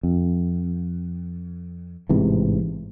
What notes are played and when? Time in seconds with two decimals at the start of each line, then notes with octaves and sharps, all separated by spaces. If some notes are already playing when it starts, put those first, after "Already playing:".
0.03 F2
2.09 A1 G#2 C3 E3